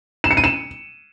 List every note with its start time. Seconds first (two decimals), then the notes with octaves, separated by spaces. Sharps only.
0.24 E7
0.31 C#7
0.37 D#7
0.44 E7